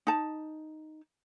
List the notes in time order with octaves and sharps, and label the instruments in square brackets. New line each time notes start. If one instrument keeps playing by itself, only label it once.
[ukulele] D#4 A5